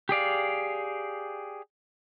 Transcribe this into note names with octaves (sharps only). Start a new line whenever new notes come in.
G4 G#4 D5 F5